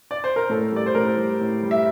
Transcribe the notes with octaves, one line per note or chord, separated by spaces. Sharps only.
D5
C5
A#4
A2 A4
G3 D5
C5
A2 A#4
G3
A2
G3
E5